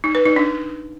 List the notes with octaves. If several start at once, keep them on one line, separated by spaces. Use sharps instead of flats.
D#4
B4
D#4
D4